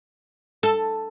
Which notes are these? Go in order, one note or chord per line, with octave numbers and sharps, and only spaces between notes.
A4